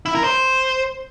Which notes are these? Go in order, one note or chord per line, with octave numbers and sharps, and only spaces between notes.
E4
A#4
C5